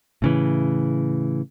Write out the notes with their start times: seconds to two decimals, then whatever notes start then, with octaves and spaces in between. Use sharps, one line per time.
0.22 A2 C#3 E3